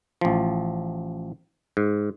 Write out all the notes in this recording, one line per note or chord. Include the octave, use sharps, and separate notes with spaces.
A1 F3
G#2